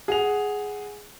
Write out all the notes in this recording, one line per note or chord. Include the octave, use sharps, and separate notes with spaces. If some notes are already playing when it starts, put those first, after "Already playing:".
G#4 F#5 F7